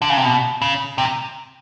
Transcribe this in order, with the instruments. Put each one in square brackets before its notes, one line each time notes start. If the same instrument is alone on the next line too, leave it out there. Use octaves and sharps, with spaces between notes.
[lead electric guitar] D3
C#3
C3
B2
C#3
C3